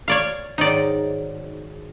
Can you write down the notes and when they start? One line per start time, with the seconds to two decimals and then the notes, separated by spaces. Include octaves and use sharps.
0.08 C#5 D5 F5
0.58 G#2 D#3 F#3 D#4 D5